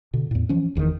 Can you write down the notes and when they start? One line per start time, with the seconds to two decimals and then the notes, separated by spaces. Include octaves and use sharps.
0.14 B2 D3
0.31 E2 A2
0.49 E3 F3 C#4
0.75 F1 E2 B2 D#3